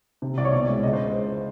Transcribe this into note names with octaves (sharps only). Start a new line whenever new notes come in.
C3
C2 D5
C#5
B2 D5
G#3
C#2 D#5
C5